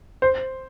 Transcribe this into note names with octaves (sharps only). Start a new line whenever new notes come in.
C5